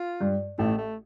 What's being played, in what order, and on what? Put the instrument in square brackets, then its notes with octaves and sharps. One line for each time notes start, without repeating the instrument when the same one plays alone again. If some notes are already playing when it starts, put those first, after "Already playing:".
Already playing: [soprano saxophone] F4
[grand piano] G2
[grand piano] A1 A2 [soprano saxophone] A3
[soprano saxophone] A3